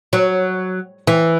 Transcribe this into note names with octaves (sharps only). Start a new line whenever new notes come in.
F#3
E3